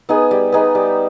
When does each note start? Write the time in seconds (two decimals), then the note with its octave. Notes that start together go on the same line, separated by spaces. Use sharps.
0.09 B3 D#4 G#4
0.31 G3
0.52 B3 D#4 G#4
0.75 G3